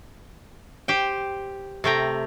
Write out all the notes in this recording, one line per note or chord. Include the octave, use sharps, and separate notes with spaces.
G4 C5 G5
C3 A3 G5 A#5